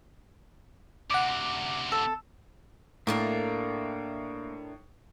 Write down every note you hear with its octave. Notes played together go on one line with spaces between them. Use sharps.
D2 C3 F#5 D6
A4
A2 A3 A#3 D4 A#4